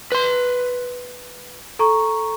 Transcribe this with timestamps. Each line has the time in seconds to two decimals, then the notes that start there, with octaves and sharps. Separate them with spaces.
0.12 B4 C6
1.79 A4 A#5 C#6